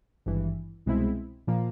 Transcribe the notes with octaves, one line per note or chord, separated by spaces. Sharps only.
G#1 G2 E3
C2 B2 G#3 C4 E4
A#2 F3 A#3